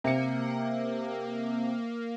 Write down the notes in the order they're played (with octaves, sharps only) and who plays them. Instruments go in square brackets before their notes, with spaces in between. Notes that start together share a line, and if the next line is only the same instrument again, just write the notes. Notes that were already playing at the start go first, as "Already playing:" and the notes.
[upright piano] C3 C#7 [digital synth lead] A#3